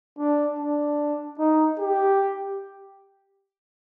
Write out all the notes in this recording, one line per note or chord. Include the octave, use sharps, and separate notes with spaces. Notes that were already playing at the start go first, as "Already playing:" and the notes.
D4
D4
D#4
G4